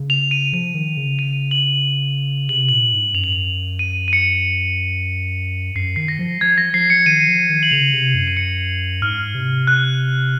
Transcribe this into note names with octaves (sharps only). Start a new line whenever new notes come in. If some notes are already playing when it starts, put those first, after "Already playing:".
Already playing: C#3
F7
D#7
F3 D#7
D#3
C#3
D#7
F#7
C3 F#7
A#2 F#7
G#2
F#2 F7
F#7
F7
D#7
D#7
C#7
F#2 C7
D#3 C7
A#6
F3
F3 G#6
A#6
F3 C7
C#7
D#3 D#7
F3
D#3
F#7
C#3 F7
C3
F#2
D#7
C#7
G#2 F6
C3
F#6